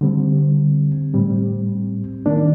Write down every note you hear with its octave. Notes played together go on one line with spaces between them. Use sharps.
D3 G3 C4
A2 G3 C4
D#3 A#3 D4